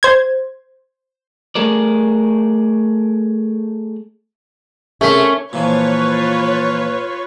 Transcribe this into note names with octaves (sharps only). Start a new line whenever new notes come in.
C5 G#6
A3 G#4 A#4 D5
C3 A3 C#4 G#4 A#4 E5 B6
A#2 E3 F3 F4 B4 C#5